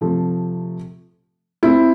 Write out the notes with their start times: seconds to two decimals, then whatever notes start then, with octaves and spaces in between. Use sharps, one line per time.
0.01 C3 F3 A3
1.63 C4 E4